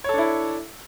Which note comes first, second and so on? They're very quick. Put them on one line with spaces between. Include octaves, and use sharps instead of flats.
C#5 A4 D4 E4